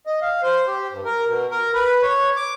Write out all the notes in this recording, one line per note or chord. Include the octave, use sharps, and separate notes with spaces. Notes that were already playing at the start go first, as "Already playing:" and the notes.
D#5
F5
C5
G4
G2
A#4
B2
A#4
B4
C#5
D6